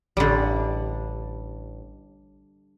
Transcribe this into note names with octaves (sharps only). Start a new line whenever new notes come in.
A1 D3 G3